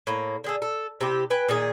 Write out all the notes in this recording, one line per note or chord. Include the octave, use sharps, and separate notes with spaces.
A2 A#3
D3 G#4 A4
A4
C3 E4 G4
B4 G5 G#5
A#2 D#3 G#4